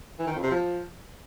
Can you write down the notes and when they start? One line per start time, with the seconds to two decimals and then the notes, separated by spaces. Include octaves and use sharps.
0.19 E3
0.27 D#3
0.35 F2
0.43 C3
0.51 F3